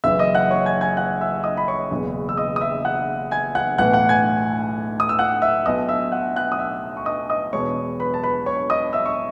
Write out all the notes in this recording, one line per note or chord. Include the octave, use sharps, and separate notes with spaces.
F#1 F#2 E3 E5 E6
D#5 D#6
F#5 F#6
C#5 C#6
G#5 G#6
G#5 G#6
F#5 F#6
E5 E6
D#5 D#6
B5
C#5 C#6
F#1 E2 B2
E6
D#5 D#6
D#6
E5 E6
F#5 F#6
G#5 G#6
F#5 F#6
B1 A2 E3 F#5 F#6
F#5 F#6
G#5 G#6
D#6
E6
F#5 F#6
E5 E6
B1 B2 D#5 D#6
E5 E6
F#5 F#6
F#5 F#6
D#6
E5 E6
C#6
D#5 D#6
D#5 D#6
E1 E2 B2 C#5 C#6
B4 B5
A5
B4 B5
C#5 C#6
D#5 D#6
E5 E6
C#6